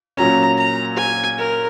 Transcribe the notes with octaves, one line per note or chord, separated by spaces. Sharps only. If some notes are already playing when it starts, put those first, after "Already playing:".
A#2 F#3 C#4 A#5
A#5
G#5
A#4